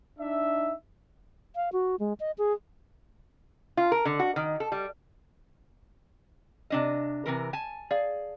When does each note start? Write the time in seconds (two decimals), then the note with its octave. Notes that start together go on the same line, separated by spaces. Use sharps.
0.19 D4 D#4 E5
1.56 F5
1.73 F#4
2.00 G#3
2.20 D#5
2.38 G#4
3.77 F4
3.92 A#4
4.05 D3
4.19 F#4
4.36 D#3
4.60 A4
4.72 G3
6.70 C3 D4 D#5
7.26 C3 E3 A#4
7.53 G#5 A5
7.91 G#4 D5 F5